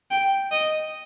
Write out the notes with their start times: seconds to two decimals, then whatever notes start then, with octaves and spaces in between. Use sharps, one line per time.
0.11 G5
0.52 D#5